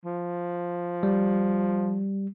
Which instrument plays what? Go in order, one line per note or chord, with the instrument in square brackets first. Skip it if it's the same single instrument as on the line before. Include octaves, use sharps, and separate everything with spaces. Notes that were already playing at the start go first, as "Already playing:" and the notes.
[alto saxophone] F3
[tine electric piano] G3